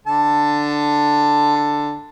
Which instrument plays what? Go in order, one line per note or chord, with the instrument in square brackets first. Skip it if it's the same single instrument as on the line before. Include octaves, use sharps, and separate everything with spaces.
[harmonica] D3 A4 A5